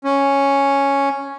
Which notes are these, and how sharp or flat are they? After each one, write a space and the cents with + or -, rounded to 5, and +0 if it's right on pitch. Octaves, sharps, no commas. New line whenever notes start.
C#4 +0